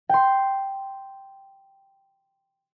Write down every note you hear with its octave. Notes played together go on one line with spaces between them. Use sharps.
G5 C6